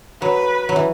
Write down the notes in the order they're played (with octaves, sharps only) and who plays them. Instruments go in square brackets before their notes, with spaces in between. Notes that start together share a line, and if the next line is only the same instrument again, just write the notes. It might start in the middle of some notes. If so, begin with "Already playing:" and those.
[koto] F#3 [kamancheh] B4
[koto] F#3
E3